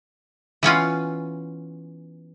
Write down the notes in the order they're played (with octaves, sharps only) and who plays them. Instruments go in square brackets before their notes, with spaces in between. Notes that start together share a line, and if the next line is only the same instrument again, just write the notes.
[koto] E3 B3 C#4 F4